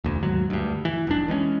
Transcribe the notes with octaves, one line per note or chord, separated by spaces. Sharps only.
E1 D2
D#2 G#2 F#3
D2 G2
E3
F1 C2 D4
E3 G#3 B3 C#4